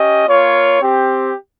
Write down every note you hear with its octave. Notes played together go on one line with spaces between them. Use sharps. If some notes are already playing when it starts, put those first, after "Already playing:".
Already playing: C#4 G4 D#5
A#3 F4 C#5
C4 G4